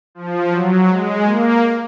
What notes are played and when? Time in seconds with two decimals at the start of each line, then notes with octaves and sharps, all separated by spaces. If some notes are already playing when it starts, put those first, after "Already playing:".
0.15 F3
0.51 F#3
0.88 G#3
1.24 A#3